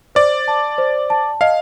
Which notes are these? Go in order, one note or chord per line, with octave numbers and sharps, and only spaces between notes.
C5 D5
A5
C5
A5
D#5 F5